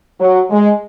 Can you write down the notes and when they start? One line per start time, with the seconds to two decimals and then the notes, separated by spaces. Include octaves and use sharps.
0.20 F#3
0.50 G#3